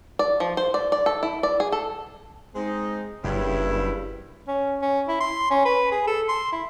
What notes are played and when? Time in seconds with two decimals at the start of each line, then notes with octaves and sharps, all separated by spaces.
0.19 D5
0.40 F3
0.57 C5
0.74 D5
0.92 D5
1.06 A4
1.23 E4
1.43 D5
1.60 G#4
1.72 A4
2.55 G#3 C4 D#4
3.24 F#1 G2 C#3 E4
4.48 C#4
4.82 C#4
5.08 E4
5.20 C6
5.50 C#4
5.65 B4
5.92 G#4
6.07 A4
6.28 C6
6.52 E4